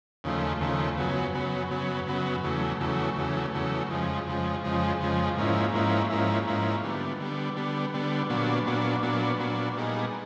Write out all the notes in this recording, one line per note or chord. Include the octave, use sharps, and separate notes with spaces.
D#2 C#3 F3 A3
D#2 C#3 F3 A3
F#2 C#3 F#3 B3
F#2 C#3 F#3 B3
F#2 C#3 F#3 B3
F#2 C#3 F#3 B3
E2 C#3 F#3 A3
E2 C#3 F#3 A3
E2 C#3 F#3 A3
E2 C#3 F#3 A3
F2 C#3 F3 G#3
F2 C#3 F3 G#3
F2 C#3 F3 G#3
F2 C#3 F3 G#3
G#2 F3 A#3 C#4 E4
G#2 F3 A#3 C#4 E4
G#2 F3 A#3 C#4 E4
G#2 F3 A#3 C#4 E4
D3 G3 B3
D3 G3 B3
D3 G3 B3
D3 G3 B3
A#2 F#3 B3 D4
A#2 F#3 B3 D4
A#2 F#3 B3 D4
A#2 F#3 B3 D4
A#2 G3 B3 D#4 G#4